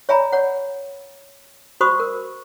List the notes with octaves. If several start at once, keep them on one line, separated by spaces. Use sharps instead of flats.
C#5 E5 G#5 A#5 B5
C#5 F#5
F#4 C5 B5 C#6 D#6
A#4